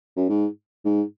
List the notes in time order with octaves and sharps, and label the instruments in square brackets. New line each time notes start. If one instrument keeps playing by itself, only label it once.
[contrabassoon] F#2
G#2
G#2